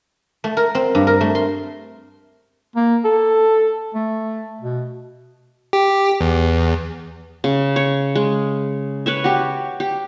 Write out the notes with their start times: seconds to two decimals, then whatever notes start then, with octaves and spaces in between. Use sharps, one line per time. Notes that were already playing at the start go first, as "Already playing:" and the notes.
0.44 A3
0.57 A#4
0.75 C4
0.95 G2
1.07 A#4
1.21 A3
1.35 C6
2.76 A#3
3.04 A4
3.95 A3
4.61 B2
5.73 G4
6.21 E2
7.44 C#3
7.76 C#5
8.15 G#3
9.06 B4 C#5 E5
9.24 F#4 G4
9.80 G4